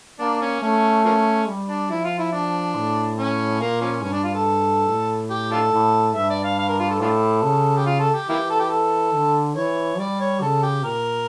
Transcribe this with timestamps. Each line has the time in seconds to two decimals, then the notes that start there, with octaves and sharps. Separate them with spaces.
0.20 A#3 D4
0.41 C#4
0.62 A3 C#4
1.05 F3 A#3 C#4
1.48 G3
1.69 D4
1.90 F3 E4
2.04 F4
2.19 E4
2.32 D4
2.76 A2
3.18 C#4
3.61 A#2 A#3
3.81 F3 A#3 C#4
4.02 G2 C#4
4.13 D4
4.24 F4
4.35 A4
4.89 A2
5.30 G4
5.52 D4 F4 A4
5.73 A2
6.16 G2 E5
6.30 D5
6.44 F5
6.59 F5
6.69 A#4
6.80 F4
6.90 A4
7.01 A2 D4 F4 A4
7.43 C#3
7.77 G4
7.86 F4
8.00 A4
8.14 G4
8.28 E3 A#3 E4 G4
8.50 A4
8.60 G4
8.70 A4
9.14 D3
9.56 E3 C#5
9.99 G3 D5
10.20 C#5
10.42 C#3 A4
10.63 G4
10.84 A#2 A#4